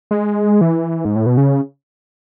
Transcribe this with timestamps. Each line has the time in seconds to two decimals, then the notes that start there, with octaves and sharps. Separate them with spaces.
0.11 G#3
0.61 E3
1.05 G#2
1.16 A2
1.26 B2
1.37 C#3